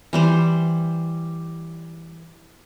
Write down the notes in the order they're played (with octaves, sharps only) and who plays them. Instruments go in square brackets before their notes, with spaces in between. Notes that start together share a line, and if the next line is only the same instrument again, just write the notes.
[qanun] E3 G3 C5